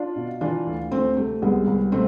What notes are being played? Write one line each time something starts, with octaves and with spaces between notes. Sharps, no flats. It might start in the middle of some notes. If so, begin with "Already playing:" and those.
Already playing: D4 F4
B2
E3 D4 F4
D2
D2 A3 C4
C3 A3
C2 G#3 B3
C2
B2 A3 C4